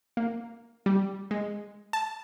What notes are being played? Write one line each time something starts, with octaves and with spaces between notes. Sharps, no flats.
A#3
G3
G#3
A5